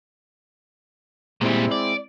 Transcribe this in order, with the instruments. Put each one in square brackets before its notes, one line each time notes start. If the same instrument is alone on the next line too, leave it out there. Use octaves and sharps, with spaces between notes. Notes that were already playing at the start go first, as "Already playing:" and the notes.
[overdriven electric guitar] A#2 G3 [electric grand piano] G#3 C4 E4
[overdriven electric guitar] D5